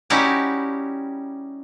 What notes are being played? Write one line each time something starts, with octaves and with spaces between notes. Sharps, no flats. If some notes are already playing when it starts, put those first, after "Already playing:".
G3 C#4 D#4 E4 F#4 G4